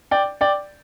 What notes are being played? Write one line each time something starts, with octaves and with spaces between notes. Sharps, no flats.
D5 G5
D5 G5